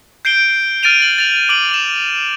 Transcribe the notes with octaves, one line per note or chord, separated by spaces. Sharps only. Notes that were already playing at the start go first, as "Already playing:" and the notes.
G6 C7 D7 G7
F6 A6 D7 D#7 F7
F#7
A6 F7
D6 D7 F#7
E7